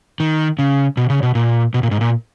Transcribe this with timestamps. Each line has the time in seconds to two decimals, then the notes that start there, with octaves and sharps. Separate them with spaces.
0.20 D#3
0.59 C#3
0.97 B2
1.10 C#3
1.23 B2
1.35 A#2
1.74 B2
1.83 A#2
1.91 G#2
2.01 A#2